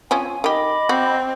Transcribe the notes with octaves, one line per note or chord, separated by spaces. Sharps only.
F3 C4 C#4 G#5
D#3 G4 D#5 B5 D6
C4 F#4